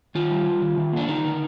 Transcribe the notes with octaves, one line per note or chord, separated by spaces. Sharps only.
D#3 F4
G3
G3
D#3
D#3
A#3 D4
D3 D#4
D3